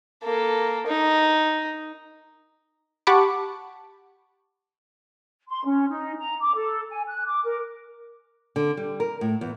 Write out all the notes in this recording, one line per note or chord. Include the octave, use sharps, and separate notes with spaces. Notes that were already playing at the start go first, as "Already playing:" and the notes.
A#3 A4
D#4
G4 F#5 A5 B5 C#6 D6
C6
C#4
D#4
A#5
D6
A4
G#5
F#6
D6
A#4
D3
G3
A#4
A2
E2